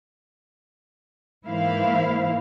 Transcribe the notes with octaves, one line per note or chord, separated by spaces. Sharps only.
G#2 E3 A#3 E4 C5 F5